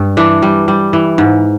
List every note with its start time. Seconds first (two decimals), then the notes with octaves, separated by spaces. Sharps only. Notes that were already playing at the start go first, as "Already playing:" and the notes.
Already playing: G2
0.17 E3 D4
0.42 G3
0.68 G3
0.93 E3
1.18 G#2